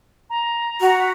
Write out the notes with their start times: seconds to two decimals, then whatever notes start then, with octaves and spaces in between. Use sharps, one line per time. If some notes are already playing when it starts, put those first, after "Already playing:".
0.30 A#5
0.81 F#4
1.00 B6